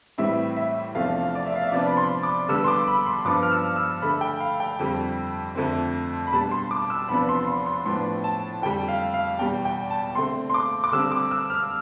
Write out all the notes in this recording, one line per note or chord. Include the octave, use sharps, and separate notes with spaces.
A2 E3 G3 C4 E5
E5
E2 C3 F3 A3 D4 F5
F5
D5
E5
F5
E5
C3 F3 B3 D4 D5
B5
C6
D6
D3 G3 B3 D4 E6
C6
D6
B5
C6
G2 F3 B3 D4 D6
F6
E6
E6
D3 A3 D4 B5
G5
F5
G5
F2 D3 G3 C4
F2 D3 A3 C4
B5
B2 G3 D4 A5
C6
D6
E6
E2 C3 F3 B3 D4 B5
C6
C6
C6
A2 F3 B3 D4 C6
A5
F2 D3 G3 G5
F5
F5
E2 B2 G3 G5
G5
A5
D3 A3 C4 C6
C6
D6
D6
D3 G3 C4 E6
D6
E6
F6